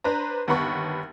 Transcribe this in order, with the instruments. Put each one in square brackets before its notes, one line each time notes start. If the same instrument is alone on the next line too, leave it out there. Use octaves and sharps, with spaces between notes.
[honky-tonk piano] D4 B4 C5 A#5
G1 D#2 B3 F#5 B5 C#6